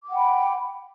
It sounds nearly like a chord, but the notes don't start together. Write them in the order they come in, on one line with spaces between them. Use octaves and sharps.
D6 F#5 G5 B5